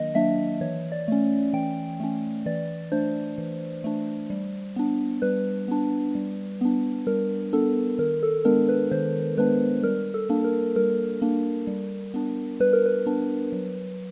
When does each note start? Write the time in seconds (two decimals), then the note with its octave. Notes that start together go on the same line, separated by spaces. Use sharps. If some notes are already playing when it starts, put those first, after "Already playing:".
Already playing: D#3 F#3 A#3 D4 D#5
0.15 F#3 A#3 D4 E5
0.61 E3 C#5
0.92 D5
1.08 A3 C#4
1.53 E3 G5
2.00 A3 C#4
2.46 E3 D5
2.92 A3 D4 C5
3.38 E3
3.84 A3 D4
4.30 G3
4.76 B3 D4
5.22 G3 B4
5.68 B3 D4
6.15 G3
6.61 B3 D4
7.07 G3 A#4
7.53 B3 D4 A4
7.99 D#3 A#4
8.23 A4
8.45 G#3 B3 D4 A#4
8.69 B4
8.91 D#3 C5
9.37 G#3 B3 D4 B4
9.83 G3 A#4
10.14 A4
10.30 A#3 D4
10.44 A#4
10.76 G3 A#4
11.22 A#3 D4
11.67 G3
12.14 B3 D4
12.60 G3 B4
12.73 A#4
12.86 B4
13.06 B3 D4
13.53 F#3